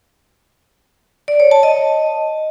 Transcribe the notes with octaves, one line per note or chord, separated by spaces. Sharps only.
D5
C#5
A5
D#5